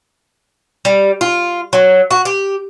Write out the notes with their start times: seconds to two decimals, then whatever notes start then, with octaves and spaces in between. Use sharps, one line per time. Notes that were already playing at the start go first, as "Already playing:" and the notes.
0.85 G3
1.21 F4
1.73 F#3
2.11 F#4
2.25 G4